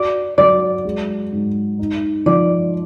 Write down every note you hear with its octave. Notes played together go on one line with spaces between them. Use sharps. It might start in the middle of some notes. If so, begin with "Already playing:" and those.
Already playing: F#4 D5
F#3 D5
G#3
G#2
D#4
F3 D5